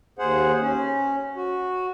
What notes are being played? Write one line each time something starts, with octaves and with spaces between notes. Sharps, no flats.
D#2 G#4 C5 F#5
C#4
F#4